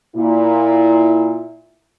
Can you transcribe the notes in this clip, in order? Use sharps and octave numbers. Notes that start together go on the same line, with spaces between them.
A#2 E4